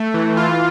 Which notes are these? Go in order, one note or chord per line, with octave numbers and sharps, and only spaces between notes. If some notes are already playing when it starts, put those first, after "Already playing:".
Already playing: A3
E3
F4